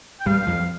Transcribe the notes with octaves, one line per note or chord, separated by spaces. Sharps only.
G5
G2 G3 F5
F2 F3